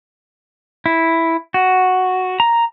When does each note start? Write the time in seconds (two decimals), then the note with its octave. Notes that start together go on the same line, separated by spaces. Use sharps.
0.86 E4
1.54 F#4
2.40 A#5